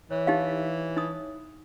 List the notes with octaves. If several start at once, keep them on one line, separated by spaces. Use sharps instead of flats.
E3 C#5
D#4 G4 F5
D#4 D#6